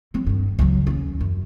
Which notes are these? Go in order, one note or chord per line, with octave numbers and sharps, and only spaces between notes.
F#3 C4
G2 D#3
C#2 F#3
D#2 C#4
F#2